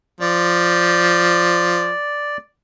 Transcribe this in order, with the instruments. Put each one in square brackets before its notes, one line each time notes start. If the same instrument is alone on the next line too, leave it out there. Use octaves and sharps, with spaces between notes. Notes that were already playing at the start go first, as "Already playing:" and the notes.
[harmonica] F3 [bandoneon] D5